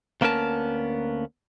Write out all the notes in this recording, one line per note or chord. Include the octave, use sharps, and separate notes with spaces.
D2 A#3 B3 C#4 A#4 A5